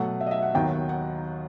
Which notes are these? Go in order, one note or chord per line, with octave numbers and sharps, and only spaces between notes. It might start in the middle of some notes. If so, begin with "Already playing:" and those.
Already playing: B2 F#3 A3 F#5
E5
D#5
E5
F#5
D#2 D#3 F#3 B3 D#4 G5
F#5
F#5